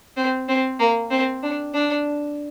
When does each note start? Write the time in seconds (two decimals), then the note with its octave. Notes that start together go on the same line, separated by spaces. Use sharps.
0.17 C4
0.49 C4
0.80 A#3
1.11 C4
1.43 D4
1.74 D4